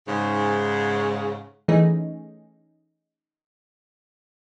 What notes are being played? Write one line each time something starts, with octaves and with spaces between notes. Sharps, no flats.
G#2 C#3
E3 A3 C#4 D#4 G#4